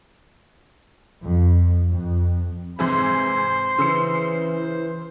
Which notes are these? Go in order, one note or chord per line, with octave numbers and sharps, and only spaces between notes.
F2
F2
G#2 C3 E3 C5 C6
C#3 E3 E6 C#7